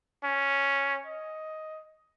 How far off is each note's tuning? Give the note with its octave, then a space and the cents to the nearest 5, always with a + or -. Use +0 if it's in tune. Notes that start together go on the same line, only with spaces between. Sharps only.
C#4 +0
D#5 +10